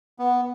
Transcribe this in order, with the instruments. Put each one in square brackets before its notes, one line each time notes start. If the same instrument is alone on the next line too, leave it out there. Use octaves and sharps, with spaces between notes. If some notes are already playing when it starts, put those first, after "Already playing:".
[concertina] B3